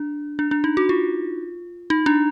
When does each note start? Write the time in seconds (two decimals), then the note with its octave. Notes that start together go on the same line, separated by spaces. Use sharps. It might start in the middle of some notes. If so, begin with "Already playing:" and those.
Already playing: D4
0.39 D4
0.51 D4
0.64 D#4
0.77 F#4
0.89 F4
1.90 D#4
2.06 D4